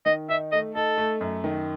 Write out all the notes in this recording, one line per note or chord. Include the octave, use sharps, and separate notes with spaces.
D#3 D#5
D#4 E5
A3 D#5
D#4 A4
A3
F#2
D#3